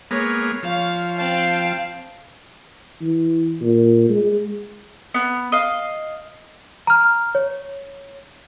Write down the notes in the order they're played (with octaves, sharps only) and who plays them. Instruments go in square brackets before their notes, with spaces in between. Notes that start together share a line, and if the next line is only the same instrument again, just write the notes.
[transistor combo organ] G#3 A#3 B3 [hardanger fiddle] C#5
[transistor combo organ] F3 [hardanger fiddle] C#5 F5
[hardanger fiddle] C4 A5 [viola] F5 G5
[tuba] E3
A#2
G#3
[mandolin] B3
D#5 F5
[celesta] A#5 F6
C#5